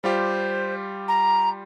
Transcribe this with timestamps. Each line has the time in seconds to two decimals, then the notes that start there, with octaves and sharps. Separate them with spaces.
0.04 G3 F4 G4 C5
1.08 A#5